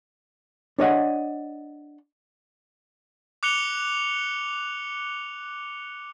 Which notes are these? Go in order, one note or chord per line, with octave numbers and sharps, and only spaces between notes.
D4 C#5 D#5 F#5
D6 F#6 C#7 F7 G7